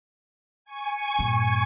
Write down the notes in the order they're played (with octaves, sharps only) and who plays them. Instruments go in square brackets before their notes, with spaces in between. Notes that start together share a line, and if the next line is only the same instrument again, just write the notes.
[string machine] G#5 C#6
[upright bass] G2 A#2